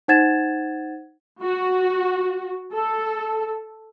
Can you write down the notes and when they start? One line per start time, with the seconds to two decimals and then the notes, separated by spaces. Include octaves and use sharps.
0.08 D#4 C5 F#5 G#6 A6 E7
1.41 F#4
2.72 A4